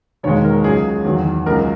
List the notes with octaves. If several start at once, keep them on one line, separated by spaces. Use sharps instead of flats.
E1 D#2 D#3 G#3 C#5
A#4
C#2 C#3 F#3 G#4
E2 D#3 F#3
C#2 C#3 F#3 A#4